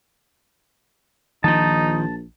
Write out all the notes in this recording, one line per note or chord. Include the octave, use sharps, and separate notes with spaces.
A#1 D#3 F3 D#4 A5